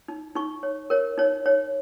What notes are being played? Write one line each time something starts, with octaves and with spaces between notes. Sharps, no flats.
D#4
D#4 C#6
C#5
A#4 C#5
D#4 C#5
D#4 C#5